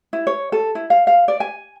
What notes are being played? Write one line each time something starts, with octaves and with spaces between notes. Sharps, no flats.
E4
C#5
A4
E4
F5
F5
D5
G#5